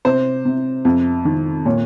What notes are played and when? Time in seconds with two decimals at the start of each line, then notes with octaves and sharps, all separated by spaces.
0.05 C3 C5
0.45 C3
0.85 F2
1.25 D#3
1.65 A#2 C#5